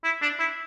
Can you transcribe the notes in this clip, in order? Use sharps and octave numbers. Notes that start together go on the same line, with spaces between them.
E4
D4
E4